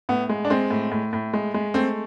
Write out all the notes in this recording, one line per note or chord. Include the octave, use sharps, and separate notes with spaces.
A2 B3
G#3
D4
G#3 C4
A2
A2
A2
G#3
G#3
A3 C4